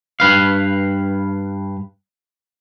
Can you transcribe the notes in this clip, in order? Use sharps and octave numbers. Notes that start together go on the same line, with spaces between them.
G2 B4 F5